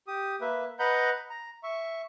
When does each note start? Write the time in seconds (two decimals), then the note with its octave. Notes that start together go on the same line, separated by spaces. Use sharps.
0.07 G4 D#6
0.41 A#3 B4 E5
0.79 B4 D#5 F#5 A#5 B5 G6
1.30 A#5
1.63 E5 C#6